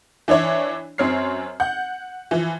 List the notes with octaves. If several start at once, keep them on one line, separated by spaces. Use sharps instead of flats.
E3 D4 E4 C#5
F#2 C4 C#5 F6 C7
F#5 G6
E3 F3